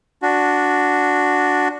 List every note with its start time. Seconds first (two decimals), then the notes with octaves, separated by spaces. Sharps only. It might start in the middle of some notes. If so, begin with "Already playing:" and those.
0.22 D4 F#4